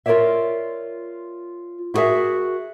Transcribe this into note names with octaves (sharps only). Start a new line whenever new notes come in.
F4 A#4 B4 C#5 D5 E5
E4 F#4 G#4 A#4 E5